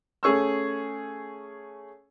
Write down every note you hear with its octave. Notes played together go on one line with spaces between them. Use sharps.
A3 C#4 G#4 C#6 E6